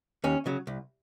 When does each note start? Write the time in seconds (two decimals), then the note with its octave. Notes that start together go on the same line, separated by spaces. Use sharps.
0.24 D#2 C#4
0.46 C#3 F#3
0.67 C2